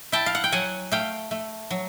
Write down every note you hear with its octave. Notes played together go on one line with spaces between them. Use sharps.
E4 G5 A5
F5
F#5
G5
F#3 F#5 G#5
A3 F5 G5
A3
F#3